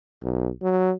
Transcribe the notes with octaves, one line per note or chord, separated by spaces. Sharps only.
B1
F#3